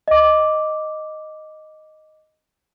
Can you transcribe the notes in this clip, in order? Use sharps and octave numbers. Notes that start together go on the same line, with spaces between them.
D#5 D6